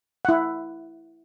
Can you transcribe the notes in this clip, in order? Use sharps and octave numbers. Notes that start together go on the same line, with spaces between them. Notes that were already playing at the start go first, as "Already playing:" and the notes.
E4 F#5